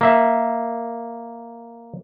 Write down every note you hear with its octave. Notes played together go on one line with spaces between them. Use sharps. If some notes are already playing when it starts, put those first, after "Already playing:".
A#3 E5